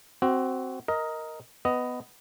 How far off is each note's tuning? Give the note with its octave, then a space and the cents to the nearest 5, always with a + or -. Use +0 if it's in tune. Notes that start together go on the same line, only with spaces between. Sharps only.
C4 +0 F#4 +20
A#4 +0 D#5 +10
B3 +10 D#5 +0